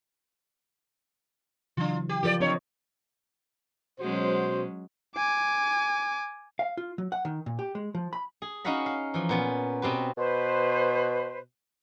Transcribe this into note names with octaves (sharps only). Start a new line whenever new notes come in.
C#3 E3 F#3 D4 F4
G4
F3 F4 G4 A4 A#4 D5
G3 C4 D4 C#5 D#5
B2 F#3 G#3 C#4 F#4 C5
G#5 D6
F5
F4
F#3
F#5
D#3
A#2
G4
G#3
F3
B5
G#4
C#4 D#4 F#4 F5 F#5 B5
F5
E3 F3
A#2 B3 C#4
B2 C4 G4 B4
B2 B4 C5